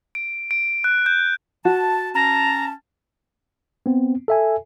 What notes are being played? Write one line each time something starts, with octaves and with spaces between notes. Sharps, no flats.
D7
D7
F#6
G6
F#4 A5
C#4 A5 A#5
B3 C4
A4 E5 G#5